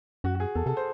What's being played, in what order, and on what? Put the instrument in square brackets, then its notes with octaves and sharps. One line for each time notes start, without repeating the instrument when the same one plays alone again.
[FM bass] F#2 [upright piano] F#4
[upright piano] F#4
G#4
[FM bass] E2 [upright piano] A4
[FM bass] C3 [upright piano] A4
[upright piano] C5